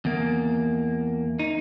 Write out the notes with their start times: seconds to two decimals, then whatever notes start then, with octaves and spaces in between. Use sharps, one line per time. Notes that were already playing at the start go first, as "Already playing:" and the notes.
0.05 E2 A#3
1.39 D#4